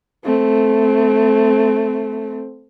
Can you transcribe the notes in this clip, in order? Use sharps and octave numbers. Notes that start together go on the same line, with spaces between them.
A3 C4